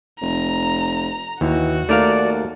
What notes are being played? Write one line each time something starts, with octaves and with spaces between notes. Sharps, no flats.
F1 A#5
D#2 E3 F#4
D#2 A3 A#4 D5 F5